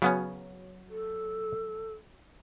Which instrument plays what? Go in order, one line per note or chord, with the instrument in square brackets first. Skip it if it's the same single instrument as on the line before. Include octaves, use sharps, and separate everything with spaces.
[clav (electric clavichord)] C#3 B3 C#4 [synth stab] F#3
[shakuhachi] A4